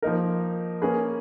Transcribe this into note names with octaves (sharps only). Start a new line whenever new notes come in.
F3 A#3 D#4 A#4
A#3 C#4 G#4 B4